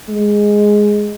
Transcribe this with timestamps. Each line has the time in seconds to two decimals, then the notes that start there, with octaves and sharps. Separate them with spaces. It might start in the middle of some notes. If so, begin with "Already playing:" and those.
0.09 G#3